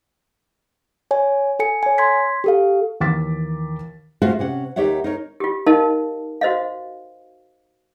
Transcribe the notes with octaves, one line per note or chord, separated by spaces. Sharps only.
C#5 G#5
A4 G#5 C#7
C#5 G#5
C6 G#6 B6
G4 A4 F5
D#2 E3 D6 A6 B6
A3 F4 F#4 G#4 C5 F5
C3 C#4 F#5
D#2 D#4 G4 C#5 E5 F#5
D#4 A#4 C#5
F4 G4
D#4 A#4 D#5 F5 A5
F#4 C5 D#5 F5